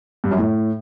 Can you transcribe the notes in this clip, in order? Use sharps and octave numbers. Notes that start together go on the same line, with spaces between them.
G2
F#2
A2